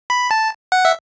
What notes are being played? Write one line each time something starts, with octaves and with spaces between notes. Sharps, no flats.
B5
A5
F#5
E5